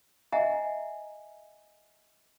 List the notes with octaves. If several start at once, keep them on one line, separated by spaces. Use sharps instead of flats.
D#5 E5 F#5 G#5 A#5